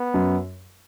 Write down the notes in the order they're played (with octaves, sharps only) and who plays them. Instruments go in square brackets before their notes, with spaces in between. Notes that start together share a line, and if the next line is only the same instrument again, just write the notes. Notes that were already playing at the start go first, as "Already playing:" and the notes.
Already playing: [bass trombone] B3
[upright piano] F#2